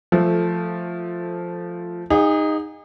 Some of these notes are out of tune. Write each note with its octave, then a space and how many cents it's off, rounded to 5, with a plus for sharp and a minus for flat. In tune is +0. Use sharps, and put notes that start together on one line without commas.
F3 +0 A3 +0 A4 -15
D#4 +0 G#4 -40 F#5 -30